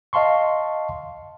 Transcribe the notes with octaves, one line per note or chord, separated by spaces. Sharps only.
D#5 F5 A5 C6 C#6